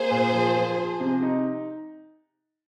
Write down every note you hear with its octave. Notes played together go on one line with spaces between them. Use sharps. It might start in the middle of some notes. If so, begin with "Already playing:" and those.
Already playing: A#3 G#4 C5
A#2
F3
F3
F3
C3
D#4